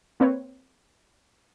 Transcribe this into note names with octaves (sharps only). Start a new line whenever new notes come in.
A#3 C4 B4 C#5